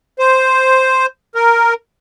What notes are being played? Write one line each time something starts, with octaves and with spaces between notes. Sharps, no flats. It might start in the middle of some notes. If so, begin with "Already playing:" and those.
C5
A#4